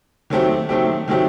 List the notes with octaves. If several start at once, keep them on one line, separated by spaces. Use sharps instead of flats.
D#3 F#3 A3 C4 G4
D#3 F#3 A3 C4 G4
D#3 F#3 A3 C4 G4